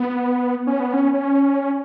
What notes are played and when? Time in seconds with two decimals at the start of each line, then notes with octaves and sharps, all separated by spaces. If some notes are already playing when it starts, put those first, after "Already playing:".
Already playing: B3
0.67 C#4
0.80 B3
0.94 C#4
1.14 C#4